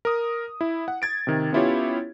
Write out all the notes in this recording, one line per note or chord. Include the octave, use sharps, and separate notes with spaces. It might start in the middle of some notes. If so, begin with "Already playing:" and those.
A#4 D#6
E4
F#5
G#6 A6 D7
C3 D#3
B3 C#4 E4 F4 G4 C#5